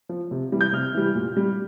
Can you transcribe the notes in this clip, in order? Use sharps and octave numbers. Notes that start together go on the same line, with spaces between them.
F3
C3
E3 G3
G6
C3 F6
E3 G3
A#2
G3